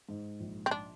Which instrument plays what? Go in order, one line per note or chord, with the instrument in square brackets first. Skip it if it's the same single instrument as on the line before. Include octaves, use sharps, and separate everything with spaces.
[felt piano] G#2
A#1
[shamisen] C4
D4